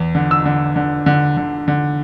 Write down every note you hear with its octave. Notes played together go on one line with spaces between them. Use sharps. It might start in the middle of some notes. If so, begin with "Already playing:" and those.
Already playing: E2
D3
E6
D3
D3
D3
D3
D3